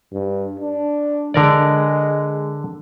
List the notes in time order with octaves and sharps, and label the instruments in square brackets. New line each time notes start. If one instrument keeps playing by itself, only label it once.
[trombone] G2
D4
[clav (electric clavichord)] D3 A#4 D5 [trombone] G#3